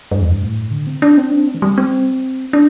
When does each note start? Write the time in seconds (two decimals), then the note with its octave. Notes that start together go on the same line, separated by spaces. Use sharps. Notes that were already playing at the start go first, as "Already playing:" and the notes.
0.11 G2
0.21 E2
0.31 G2
0.42 A2
0.71 D3
0.87 C4
1.02 D4
1.17 C4
1.32 D4
1.47 C4
1.55 E3
1.62 G3
1.78 C4
2.53 D4